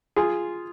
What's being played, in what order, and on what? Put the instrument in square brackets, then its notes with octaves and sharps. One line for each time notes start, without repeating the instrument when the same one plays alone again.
[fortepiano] F4 G#4